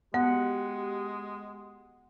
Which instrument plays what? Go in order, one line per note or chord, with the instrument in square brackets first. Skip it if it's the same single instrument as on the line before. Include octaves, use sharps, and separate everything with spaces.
[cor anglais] G#3 [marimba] B3 [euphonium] G4 [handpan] F#5